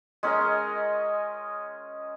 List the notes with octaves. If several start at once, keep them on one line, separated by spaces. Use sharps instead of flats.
G#3 C#4 A#4 D#5